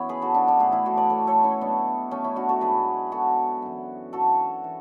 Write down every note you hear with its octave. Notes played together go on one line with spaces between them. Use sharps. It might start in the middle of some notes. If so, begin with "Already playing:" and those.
Already playing: F#2 C#3 E3 B3 C#4 E4 C#5
G#4 B4
F#4 A4
D4 F#4
D4 F#4
A2 E3 E4 G#4
E4 G#4
F#4 A4
B4 D5
A4 C#5
A4 C#5
C#4 E4
B2 F#3 B3 D4
A3 C#4
C#4 E4
D4 F#4
F#4 A4
G#2 F#3 G#4 B4
F#4 A4
F#2 E3
F#4 A4
E3